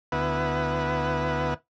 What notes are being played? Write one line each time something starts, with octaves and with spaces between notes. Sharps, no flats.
D2 B3 E4 B4 F#5